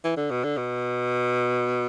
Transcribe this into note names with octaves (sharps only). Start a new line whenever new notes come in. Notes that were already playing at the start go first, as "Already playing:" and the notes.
E3
D3
B2
D3
B2